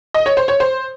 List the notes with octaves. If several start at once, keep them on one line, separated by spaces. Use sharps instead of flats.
D#5
C#5
C5
C#5
C5